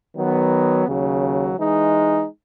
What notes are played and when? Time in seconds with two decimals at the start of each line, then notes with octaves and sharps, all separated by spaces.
0.16 D#3 F#3 B3
0.86 D#2 C#3 F#3
1.56 E3 G#3 D#4